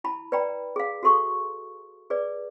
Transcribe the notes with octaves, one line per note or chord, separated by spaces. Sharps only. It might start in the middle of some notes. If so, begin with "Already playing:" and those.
E4 A5 B5
B4 D5 G5 A#5 B5
G#4 F5
F#4 G#4 A4 C6 C#6 D#6
G#4 B4 D5